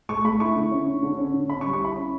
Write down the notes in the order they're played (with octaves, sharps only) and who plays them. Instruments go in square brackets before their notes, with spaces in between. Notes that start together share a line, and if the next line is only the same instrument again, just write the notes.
[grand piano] A3 C#6
A3 B5
E4 C#6
D3
C#4
D3
D3
C#4
D3
C#4 B5
C#6
G3
C#6
E4 B5
C#4